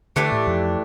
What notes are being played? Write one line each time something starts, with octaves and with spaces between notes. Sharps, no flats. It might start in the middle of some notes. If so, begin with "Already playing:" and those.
D3 E3 A3 D4 G4
A2
F2